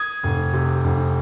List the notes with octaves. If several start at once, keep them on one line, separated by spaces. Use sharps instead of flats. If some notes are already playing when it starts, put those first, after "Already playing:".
Already playing: D#6 G#6
F1
C3
F1